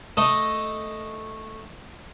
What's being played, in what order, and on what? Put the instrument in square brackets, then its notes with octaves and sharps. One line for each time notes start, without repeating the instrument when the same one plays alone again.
[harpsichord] A3 D#5